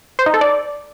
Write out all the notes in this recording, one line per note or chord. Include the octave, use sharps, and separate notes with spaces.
C5
D#4
A4
D5